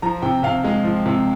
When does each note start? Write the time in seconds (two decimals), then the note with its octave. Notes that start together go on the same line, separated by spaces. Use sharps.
0.02 F3 A#5
0.22 C3 G5
0.43 C3 F5
0.64 G#3
0.84 F3
1.06 C3